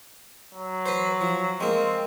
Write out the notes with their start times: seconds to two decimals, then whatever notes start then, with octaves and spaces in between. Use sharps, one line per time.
0.54 F#3
0.86 B4 C5
1.21 F3
1.60 G#3 A#3 C4